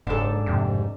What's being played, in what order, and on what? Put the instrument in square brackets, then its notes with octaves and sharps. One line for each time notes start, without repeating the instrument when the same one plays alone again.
[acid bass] F#1 [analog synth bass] G#2 [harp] D4 A4
[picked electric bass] F1 G2 F3 [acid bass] C3